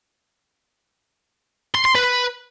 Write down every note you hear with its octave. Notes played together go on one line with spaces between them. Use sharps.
C6
C6
B4